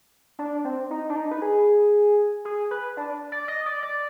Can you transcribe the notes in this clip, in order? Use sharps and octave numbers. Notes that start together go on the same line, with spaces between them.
D4
C4
D#4
D4
D#4
B4
G#4
G#4
B4
D4
D5
D#5
D5
D5